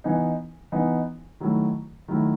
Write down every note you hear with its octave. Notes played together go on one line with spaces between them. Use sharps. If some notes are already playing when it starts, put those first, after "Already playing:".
E3 B3 D#4
E3 B3 D#4
D#3 F#3 A3 E4
D#3 F#3 A3 E4